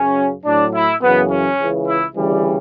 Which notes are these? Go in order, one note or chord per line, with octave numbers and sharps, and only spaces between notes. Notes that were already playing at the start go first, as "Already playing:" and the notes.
Already playing: F#2 C#3 F#3 C#4
A2 F#3 D4
E4
F#2 C#3 E3 B3
C#4
C#2 C#3 E3
E4
D2 C#3 E3 G3